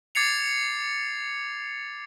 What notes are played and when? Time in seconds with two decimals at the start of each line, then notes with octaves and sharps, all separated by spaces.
0.15 D6 G#6 A6 C7 C#7 F7